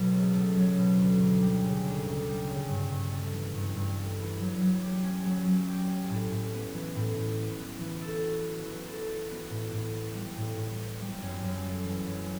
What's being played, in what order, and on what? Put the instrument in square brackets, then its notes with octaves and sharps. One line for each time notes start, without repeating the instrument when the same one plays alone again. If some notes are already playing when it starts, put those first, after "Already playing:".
Already playing: [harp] B2 F#3 A3
C#2
A3
F#3
B2
D2
D2
G3
C#3
D2
D2
G3
C#3
G2
G2
A3
E3
G2
G2
A3
E3
F#3
F#3
G4
C#4
F#3
F#3
G4
C#4
A2
A2
B3
E3
A2
A2
B3
E3
E3
A4
F#4
B3
E3
A4
F#4
B3
A2
A2
B3
G3
A2
A2
B3
G3
F#2
F#2
A3
E3
F#2